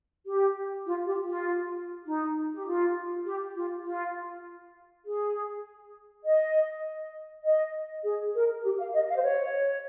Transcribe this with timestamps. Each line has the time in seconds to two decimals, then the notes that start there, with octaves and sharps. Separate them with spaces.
0.27 G4
0.87 F4
1.06 G4
1.26 F4
2.06 D#4
2.54 G4
2.66 F4
3.26 G4
3.55 F4
3.85 F4
5.05 G#4
6.24 D#5
7.44 D#5
8.03 G#4
8.34 A#4
8.63 G4
8.78 F5
8.94 D#5
9.09 F5
9.16 C5
9.23 C#5